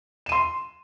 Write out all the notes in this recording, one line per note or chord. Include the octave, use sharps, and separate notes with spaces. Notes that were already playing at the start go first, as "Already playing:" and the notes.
C6 D#7 E7